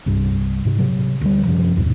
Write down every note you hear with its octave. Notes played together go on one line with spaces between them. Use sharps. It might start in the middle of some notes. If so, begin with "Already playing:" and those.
C2 G2
G#2 C3
C3 F#3
D2 G3
F#2 C3 F3
D#2 G#2 B2